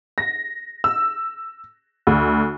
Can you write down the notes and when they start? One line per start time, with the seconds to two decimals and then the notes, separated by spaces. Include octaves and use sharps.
0.18 A#6
0.84 E6
2.07 D2